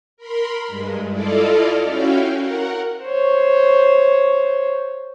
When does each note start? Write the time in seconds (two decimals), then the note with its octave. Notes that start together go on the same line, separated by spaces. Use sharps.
0.17 A#4 B5 C6
0.67 G2 G#3
1.10 E4 F4 A4 D5 D#5 F5
1.84 C#4 E4 F#4 F5 G5
2.35 A#4 F#5
3.04 C5 C#5